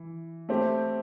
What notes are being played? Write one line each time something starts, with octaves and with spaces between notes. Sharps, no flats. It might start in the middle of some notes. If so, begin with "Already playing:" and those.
Already playing: E3
A3 C4 G4